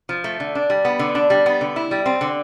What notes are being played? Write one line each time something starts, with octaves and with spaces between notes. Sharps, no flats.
F3
A3
D3
D4
G3
B3
D3
D4
G3
B3
D3
E4
G3
C4
D3